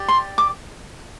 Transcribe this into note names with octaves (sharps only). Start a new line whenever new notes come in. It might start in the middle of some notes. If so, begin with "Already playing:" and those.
Already playing: G4 D5
C6
D6